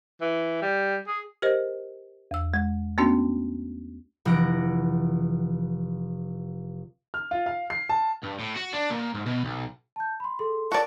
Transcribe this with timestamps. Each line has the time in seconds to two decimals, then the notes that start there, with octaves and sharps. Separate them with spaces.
0.21 E3
0.62 G3
1.08 G#4
1.42 G4 A#4 C5 D#5
2.31 E2 E6
2.54 G#3
2.98 A3 B3 C#4 D4 F#4
4.25 F1 E3 F#5 A#6 D7
7.14 F6
7.31 F4
7.46 F5
7.70 C7
7.89 A5
8.24 G2
8.40 A2
8.57 F#4
8.74 D4
8.90 A#2
9.15 G#2
9.26 B2
9.45 B1
9.96 A5 G6
10.20 B5 C6
10.39 G#4 A4 C6
10.72 F#4 A#4 D5 A5